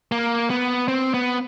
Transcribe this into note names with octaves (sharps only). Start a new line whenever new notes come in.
A#3
B3
C4
B3